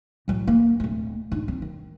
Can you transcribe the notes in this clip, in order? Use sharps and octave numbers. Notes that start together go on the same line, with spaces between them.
A2 F#3
A#3
D1 A3
G#2 D4
C4
D#3